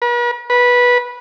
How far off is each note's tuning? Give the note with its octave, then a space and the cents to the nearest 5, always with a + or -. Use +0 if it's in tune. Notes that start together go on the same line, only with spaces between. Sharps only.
B4 -45
B4 -15